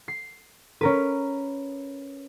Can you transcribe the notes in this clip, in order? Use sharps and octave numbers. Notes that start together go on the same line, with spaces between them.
C7
C#4 A#4 B4